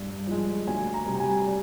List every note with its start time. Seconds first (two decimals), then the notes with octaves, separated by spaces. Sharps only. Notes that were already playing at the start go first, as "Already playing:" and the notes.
Already playing: G2
0.27 F3 G#3
0.67 D2 G#5
0.94 A#5
1.06 C3 G3
1.20 G#5
1.47 D5